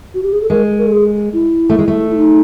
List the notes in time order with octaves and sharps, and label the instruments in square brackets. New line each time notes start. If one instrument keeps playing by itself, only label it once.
[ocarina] F#4
G4
G#4
A4
[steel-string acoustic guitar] G#3 [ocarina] A#4
[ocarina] A#4
A4
G#4
E4
[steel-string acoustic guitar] A3
G#3
A3
[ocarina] E4
D#4